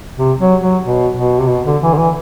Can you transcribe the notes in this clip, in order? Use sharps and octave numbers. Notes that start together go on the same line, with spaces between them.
C3
F#3
F#3
B2
B2
C3
B2
D3
E3
D3
E3